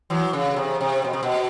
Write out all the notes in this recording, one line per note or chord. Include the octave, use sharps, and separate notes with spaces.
E3 F#3
C#3
C3
C3
B2
C3
B2